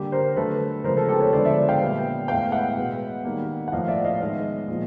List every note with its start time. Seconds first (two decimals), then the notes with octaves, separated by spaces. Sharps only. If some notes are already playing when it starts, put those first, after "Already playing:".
Already playing: D3 G3 A#3 G4
0.12 A#4 C5
0.36 D3 F#3 A3 A4 B4
0.84 C#3 F3 G#3 B3 A#4 C5
0.97 A4 B4
1.09 G4 A4
1.20 B4 C#5
1.33 D3 F3 G#3 B3 C5 D5
1.45 D5 E5
1.69 F5 G5
1.81 A#2 G3 B3
2.28 A2 E3 G#3 B3 F5 G5
2.52 E5 F#5
2.77 B2 G#3 B3
3.25 D#3 G3 A#3
3.68 F#5
3.72 A2 F3 A#3 D#5 F5
3.84 F5
3.88 D5 E5
4.05 D#5 F5
4.20 D#3 G#3 B3 D#5 F5
4.68 A#2 F3